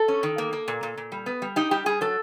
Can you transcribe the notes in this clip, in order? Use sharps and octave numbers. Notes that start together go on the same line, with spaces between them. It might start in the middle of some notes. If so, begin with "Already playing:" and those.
Already playing: A4
C#4
D#3
A#3
A#3
A#2
A#2
A#2
G3
B3
G3
D#4 G4
G3 G4
G3 G#4
F#3 A4